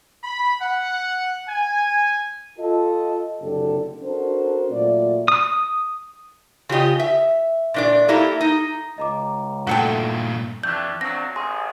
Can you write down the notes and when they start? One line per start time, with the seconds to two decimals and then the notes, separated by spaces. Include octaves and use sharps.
0.24 B5
0.60 F#5
1.48 G#5
2.58 F4 A4 D#5
3.41 F#1 C2 D3 G4 A4
4.02 C#4 D4 F#4 A4 A#4 C5
4.71 A#2 F#3 A3 F4 D5
5.28 D#6
6.69 C#3 F4 G4 D#5
6.99 E5
7.74 A#2 D4 D5
8.08 A3 A#3 E4 G4
8.41 D#4
8.98 C#2 D#5 A#5 D6
9.67 G2 A#2 A3 F#4 A4 G5
10.63 F2 E3 G3 A3 D4 G6
11.01 E2 A#2 F#3 C4 D4 A#6
11.36 A1 G#4 C6